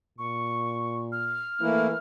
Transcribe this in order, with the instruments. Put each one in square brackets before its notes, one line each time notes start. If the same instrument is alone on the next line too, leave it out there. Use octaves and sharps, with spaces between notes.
[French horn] A#2 [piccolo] C#6
[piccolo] F6
[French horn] E3 [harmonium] A3 A#3 E4